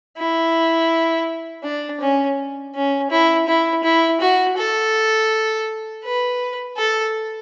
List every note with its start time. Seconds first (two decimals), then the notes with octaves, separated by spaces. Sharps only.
0.18 E4
1.64 D4
2.00 C#4
2.75 C#4
3.10 E4
3.48 E4
3.84 E4
4.21 F#4
4.57 A4
6.04 B4
6.77 A4